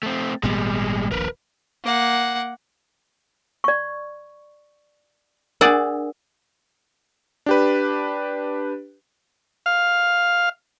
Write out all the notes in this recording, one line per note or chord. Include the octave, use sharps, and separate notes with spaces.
A3 C4
G#1 A#2 G3 G#3 B3
D#1 A#1 A#4 B4
A#3 F#5
D5 C#6
D4 G#4 A#4 D5 F#5
D4 G4 B4
F5